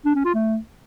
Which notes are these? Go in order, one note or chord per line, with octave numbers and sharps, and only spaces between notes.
D4
C#4
F4
A3